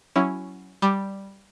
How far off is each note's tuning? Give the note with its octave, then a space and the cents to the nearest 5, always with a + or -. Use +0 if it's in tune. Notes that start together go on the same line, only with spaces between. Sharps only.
F#3 +10 C#4 +0 E4 +0
G3 +0 D6 +10